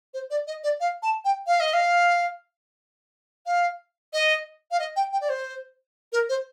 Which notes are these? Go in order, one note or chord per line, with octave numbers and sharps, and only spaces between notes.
C5
D5
D#5
D5
F5
A5
G5
F5
D#5
F5
F5
D#5
F5
D#5
G5
G5
D5
C5
A#4
C5